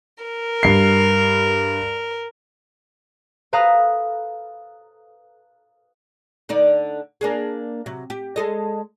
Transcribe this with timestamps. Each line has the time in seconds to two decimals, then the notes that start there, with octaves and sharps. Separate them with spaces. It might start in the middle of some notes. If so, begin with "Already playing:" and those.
0.22 A#4
0.63 G2 C7
3.53 A4 B4 F5 A#5 D#6 F#6
6.49 D3 D#4 D5
7.21 A#3 D4 G#4
7.86 C3 F#3
8.10 G4
8.36 G#3 A4 D#5